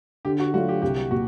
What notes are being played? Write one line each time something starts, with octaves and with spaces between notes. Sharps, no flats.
D3 G4
F#4
F#3 A3 D4 F4 F#4
G4
C2 G4
A#2 F#4